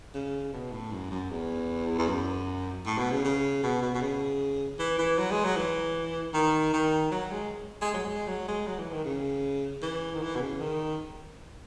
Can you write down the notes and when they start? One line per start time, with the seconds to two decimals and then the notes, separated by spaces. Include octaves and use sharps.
0.14 C#3
0.53 B2
0.72 A2
0.92 F#2
1.11 F#2
1.30 E2
1.98 E2
2.08 F#2
2.86 A2
2.98 B2
3.11 C#3
3.25 C#3
3.63 B2
3.82 B2
3.95 B2
4.01 C#3
4.79 E3
4.98 E3
5.19 F#3
5.31 G#3
5.44 F#3
5.57 E3
6.34 D#3
6.73 D#3
7.11 F#3
7.31 G#3
7.82 G#3
7.94 F#3
8.05 G#3
8.28 F#3
8.48 G#3
8.67 F#3
8.79 E3
8.93 D#3
9.05 C#3
9.82 E3
10.14 D#3
10.22 E3
10.35 B2
10.40 C#3
10.61 D#3